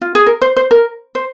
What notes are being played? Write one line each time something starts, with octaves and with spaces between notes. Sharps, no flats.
F4
G#4
A#4
C5
C5
A#4
C5